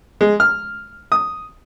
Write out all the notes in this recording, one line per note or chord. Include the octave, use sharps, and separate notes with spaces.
G#3
F6
D#6